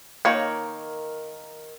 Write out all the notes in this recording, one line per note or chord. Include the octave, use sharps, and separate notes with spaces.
D#3 A#3 C#5